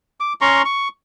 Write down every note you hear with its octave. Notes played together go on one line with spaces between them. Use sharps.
D6
C#4 A#5 C6 C#6
C#6